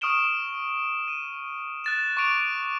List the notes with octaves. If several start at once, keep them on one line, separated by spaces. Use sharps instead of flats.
C#6 D#6 F6 D7 E7 G7
D#7
F#6 A6 E7
C#6 D6 A6 D7 F7